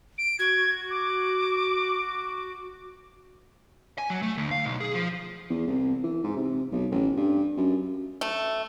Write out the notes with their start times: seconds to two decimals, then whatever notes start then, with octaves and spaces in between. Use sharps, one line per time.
0.18 D7
0.39 F#4 G#6
0.90 D6
3.98 G#5
4.10 F#3
4.22 A3
4.38 D2
4.51 F5
4.65 B1
4.80 G#4
4.95 F3
5.50 E2
5.67 C2
6.04 E3
6.23 G#2
6.37 C3
6.72 B1
6.92 A1
7.17 G2
7.57 F#2
8.21 A3